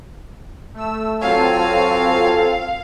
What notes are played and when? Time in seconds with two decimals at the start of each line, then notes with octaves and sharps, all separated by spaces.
0.74 A3 E6
1.21 F#3 C4 F4 A4 C#5 F5 G#5